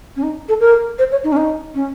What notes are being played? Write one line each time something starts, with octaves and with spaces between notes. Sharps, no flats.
C#4
D#4
A4
A#4
C5
C#5
D#4
C#4
D#4
C#4